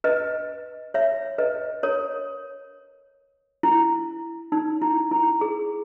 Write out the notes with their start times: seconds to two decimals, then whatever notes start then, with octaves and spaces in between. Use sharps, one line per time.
0.04 B4 D#5
0.94 C#5 E5
1.38 B4 D#5
1.83 A#4 C#5
3.63 E4
4.52 D#4
4.82 E4
5.11 E4
5.41 G#4